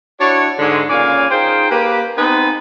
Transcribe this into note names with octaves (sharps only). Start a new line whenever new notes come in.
D4 E4 F#4 C#5
G#2 D3 G#3
A#2 C#3 C#4 D5 F5 G#5
D#4 F4 G#4 C5 G5
A#3 G4 B4
B3 C4 D#4 B4 G#5